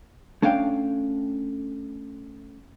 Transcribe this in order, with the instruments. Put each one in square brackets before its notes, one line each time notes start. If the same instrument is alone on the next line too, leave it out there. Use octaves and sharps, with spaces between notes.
[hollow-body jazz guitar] A3 C#4 D4 F5 G5